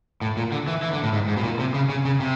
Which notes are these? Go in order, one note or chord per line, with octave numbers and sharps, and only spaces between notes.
A2
A#2
D3
E3
E3
D3
A2
G#2
G#2
B2
A#2
C3
C#3
C#3
C#3
C3